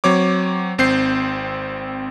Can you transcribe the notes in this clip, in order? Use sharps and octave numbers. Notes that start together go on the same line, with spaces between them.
F#3 C4 C#5 D6
G#1 C4 G6 C7